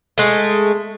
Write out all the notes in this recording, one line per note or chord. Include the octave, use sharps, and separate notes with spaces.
G#3 A3